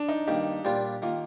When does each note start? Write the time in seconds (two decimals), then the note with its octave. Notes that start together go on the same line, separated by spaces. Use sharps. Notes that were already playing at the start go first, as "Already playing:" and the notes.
Already playing: D4
0.08 D#4
0.27 G2 D#3 A#3 D#4 G4
0.65 A#2 G3 D4 F4 G4 C5
1.02 D#3 A#3 F4